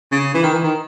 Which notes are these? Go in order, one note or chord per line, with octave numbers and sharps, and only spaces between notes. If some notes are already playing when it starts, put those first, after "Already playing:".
C#3
E3
D#3
E3
D#3